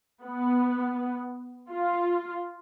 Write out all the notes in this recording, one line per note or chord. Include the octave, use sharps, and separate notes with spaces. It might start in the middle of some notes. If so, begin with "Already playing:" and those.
B3
F4